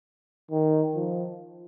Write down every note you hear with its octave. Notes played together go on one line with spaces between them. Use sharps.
D#3
F3